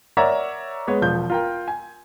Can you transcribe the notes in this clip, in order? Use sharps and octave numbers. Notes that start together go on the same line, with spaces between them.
A#4 C#5 D5 E5 F#5 A#5
G#3 B3 C#5
E1 F3 G6
F4 A#4 G5
G#5